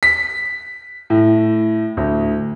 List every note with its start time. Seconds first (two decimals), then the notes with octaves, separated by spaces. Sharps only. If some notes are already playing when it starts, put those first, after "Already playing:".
0.03 B6
1.10 A2
1.97 D2